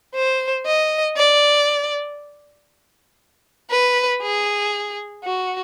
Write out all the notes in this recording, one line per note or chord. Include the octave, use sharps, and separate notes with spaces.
C5
D#5
D5
B4
G#4
F#4